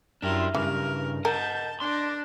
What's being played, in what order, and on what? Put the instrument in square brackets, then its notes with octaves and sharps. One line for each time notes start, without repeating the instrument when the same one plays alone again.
[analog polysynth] F#2 E4 C6 [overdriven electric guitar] D4 G4 [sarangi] A#4
[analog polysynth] G2 [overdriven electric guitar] C#3 [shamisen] E3 [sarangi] A#4
[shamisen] A#4 [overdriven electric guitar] D#5 F#5 [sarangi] A5 [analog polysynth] G6
[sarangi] D4 [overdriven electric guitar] C6 [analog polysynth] D6 A#6